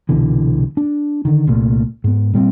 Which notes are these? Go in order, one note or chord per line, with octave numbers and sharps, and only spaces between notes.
C2 B2 D3 E3
D4
D3 D#3
C2 A#2 A3
G#2 B3
A#2 G3 B3 C4